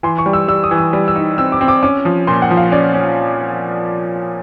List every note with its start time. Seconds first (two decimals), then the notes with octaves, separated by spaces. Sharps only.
0.03 E3 C6
0.18 C#6
0.26 G3
0.33 E6
0.48 G3 E6
0.63 D#6
0.71 E3
0.78 E6
0.93 G3
1.08 E6
1.16 D#4
1.38 C4 E6
1.52 D6
1.61 C4
1.68 D6
1.83 C#4 D6
2.05 F3
2.27 A#2 C6
2.42 F#5
2.50 F3
2.57 F5
2.72 C#4 D5
2.94 C#4